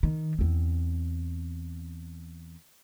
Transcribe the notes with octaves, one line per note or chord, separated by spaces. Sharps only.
D#3
E2 C4